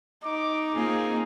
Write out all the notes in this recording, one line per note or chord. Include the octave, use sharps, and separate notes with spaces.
D#4 D6
A#3 C4 F4 G#4